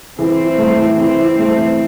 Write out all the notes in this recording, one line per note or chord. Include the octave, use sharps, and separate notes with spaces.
E3 C4
E4
A3
E3
E3 C4
E4
A3 C4
E3